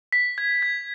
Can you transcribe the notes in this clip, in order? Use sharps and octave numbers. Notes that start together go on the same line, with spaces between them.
B6
G#6
G#6